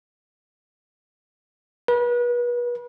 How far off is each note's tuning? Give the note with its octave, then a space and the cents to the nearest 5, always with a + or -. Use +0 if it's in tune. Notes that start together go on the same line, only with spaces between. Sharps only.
B4 -35